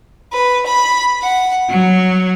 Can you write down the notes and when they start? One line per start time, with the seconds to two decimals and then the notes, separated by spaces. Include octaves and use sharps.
0.33 B4
0.67 B5
1.22 F#5
1.69 F#3